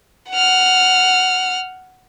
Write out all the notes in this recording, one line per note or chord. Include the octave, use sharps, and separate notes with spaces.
F#5 F6